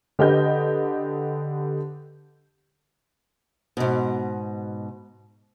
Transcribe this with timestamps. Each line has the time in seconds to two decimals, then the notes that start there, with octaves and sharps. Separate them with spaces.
0.19 D3 G4 B4 D#5 G6
3.77 G#2 B2